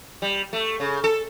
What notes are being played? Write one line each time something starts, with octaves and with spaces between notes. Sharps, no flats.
G3
A3
C#3
A4